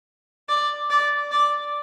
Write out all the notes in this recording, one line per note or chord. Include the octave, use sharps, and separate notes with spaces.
D5
D5
D5